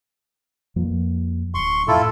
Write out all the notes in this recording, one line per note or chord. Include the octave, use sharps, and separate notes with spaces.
F2 F3 A#3
D1 C6 C#6
F2 A2 E4 F4 A4